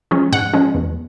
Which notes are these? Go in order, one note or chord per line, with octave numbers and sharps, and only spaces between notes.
F3 G#3 C#4
G#2 F#5
F3 G#3 C#4
E2